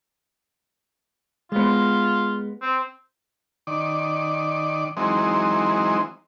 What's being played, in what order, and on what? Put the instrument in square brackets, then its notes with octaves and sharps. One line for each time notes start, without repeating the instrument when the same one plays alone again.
[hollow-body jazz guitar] G#3 B3 [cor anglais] F4
[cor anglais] C4
[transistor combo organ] D#3 D5
E3 F#3 G#3 C4 D#4